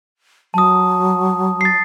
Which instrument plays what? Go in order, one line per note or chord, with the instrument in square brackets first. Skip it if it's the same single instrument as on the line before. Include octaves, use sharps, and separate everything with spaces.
[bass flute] F#3 [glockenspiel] A5 D#6
[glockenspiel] A6 C7